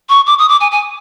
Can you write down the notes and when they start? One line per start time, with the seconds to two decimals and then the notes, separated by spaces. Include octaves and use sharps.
0.09 C#6
0.27 D6
0.39 D#6
0.49 D6
0.61 G#5
0.72 G#5